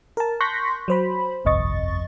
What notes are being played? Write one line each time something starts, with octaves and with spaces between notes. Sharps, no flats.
A#4 A5
C6 C#6 F#6 G6 A#6 B6
F#3 C5 B5
G1 C2 F2 D#5 C#6 A6